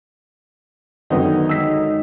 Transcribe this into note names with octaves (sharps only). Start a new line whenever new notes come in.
F#2 D3 D#3 B3 D#4
G#3 D#4 E6 B6